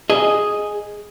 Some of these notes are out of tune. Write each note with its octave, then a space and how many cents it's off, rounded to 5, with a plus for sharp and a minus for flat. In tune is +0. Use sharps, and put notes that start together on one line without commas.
G#4 +0 D#5 -5